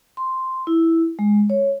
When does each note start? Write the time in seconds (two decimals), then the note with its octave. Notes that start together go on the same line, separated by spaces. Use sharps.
0.17 C6
0.67 E4
1.19 G#3
1.50 C#5